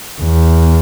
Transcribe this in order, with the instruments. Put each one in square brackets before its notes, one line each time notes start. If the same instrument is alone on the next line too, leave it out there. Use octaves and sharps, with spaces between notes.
[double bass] E2